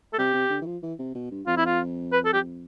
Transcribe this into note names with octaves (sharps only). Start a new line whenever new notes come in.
A4
C3 G4
C3
D3
E3
F3
E3
C3
B2
G2
F2 F4
E4
F4
B4
A4
G4